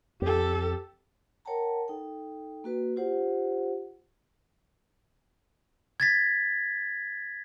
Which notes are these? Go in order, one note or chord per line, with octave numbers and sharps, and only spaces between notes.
F2 G4 A4
A#4 C#5 F#5 G5 A5 A#5
D#4 A4 G5
A#3 F#4 B4
F4 G4 C5 F#5
G#6 A6 B6